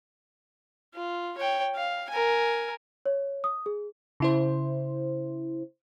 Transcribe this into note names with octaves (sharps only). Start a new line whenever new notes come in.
F4
C#5 G5
F5
A#4 G#5
C#5
D#6
G#4
C#3 E4 C5